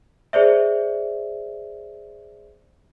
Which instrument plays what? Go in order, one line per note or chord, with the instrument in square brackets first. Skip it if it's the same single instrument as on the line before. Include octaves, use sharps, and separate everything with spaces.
[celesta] G#4 C5 D5 E5